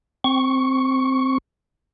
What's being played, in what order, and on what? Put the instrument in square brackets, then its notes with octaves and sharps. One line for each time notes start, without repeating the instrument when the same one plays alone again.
[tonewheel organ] C4 C#6